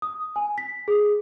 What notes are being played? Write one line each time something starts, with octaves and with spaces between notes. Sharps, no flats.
D#6
G#5
B6
G#4